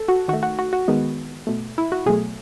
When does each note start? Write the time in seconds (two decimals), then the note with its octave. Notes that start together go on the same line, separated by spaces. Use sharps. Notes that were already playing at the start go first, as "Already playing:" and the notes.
Already playing: A4
0.08 F#4
0.28 D#3 F#4
0.33 A3
0.43 F#4
0.59 F#4
0.73 F#4
0.88 D#3 G#3 B3
1.47 B2 A3
1.78 E4
1.92 F#4
2.06 B2 F#3 A3 G#4